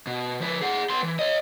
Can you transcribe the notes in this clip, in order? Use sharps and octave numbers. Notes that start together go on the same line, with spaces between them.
B2
F3 B4
G#4 F#5
B3 C6
E3
C#5 D#5